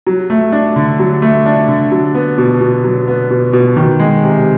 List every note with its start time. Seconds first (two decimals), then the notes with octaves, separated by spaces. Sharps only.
0.07 F#3
0.30 A3
0.52 D4
0.76 D3
0.99 F#3
1.22 A3
1.46 D4
1.68 D3
1.91 F#3
2.15 B3
2.38 B2
2.61 B2
2.84 F#3
3.08 B3
3.31 B2
3.53 B2
3.77 D#3
4.00 G#3
4.23 C3